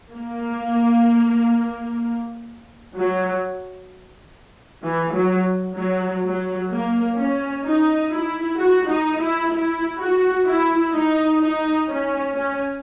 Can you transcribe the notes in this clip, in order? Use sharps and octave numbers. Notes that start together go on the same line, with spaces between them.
A#3
F#3
E3
F#3
F#3
F#3
A#3
C#4
D#4
E4
F#4
D#4
E4
E4
F#4
E4
D#4
D#4
C#4
C#4